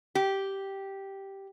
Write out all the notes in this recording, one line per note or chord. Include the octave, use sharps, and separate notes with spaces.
G4